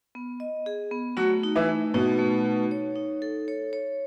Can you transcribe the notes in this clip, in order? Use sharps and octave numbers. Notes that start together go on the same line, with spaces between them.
B3
D#5
G#4
B3
F#3 A3 F#4
D#4
E3 E4
A3
B2 B3 D#4
A3
D#4
C#5
D#4
A4
C#5
C#5